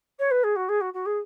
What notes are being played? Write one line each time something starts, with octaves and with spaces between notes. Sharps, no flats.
C#5
B4
G#4
F#4
G#4
F#4
F#4
G#4